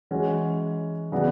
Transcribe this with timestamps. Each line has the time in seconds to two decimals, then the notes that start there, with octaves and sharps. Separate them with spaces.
0.11 E3 G#3 C#4 F#4
1.12 C#3 E3 B3 D4 F#4